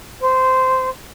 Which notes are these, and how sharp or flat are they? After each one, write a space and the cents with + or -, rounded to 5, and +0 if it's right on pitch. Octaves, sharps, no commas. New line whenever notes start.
C5 -15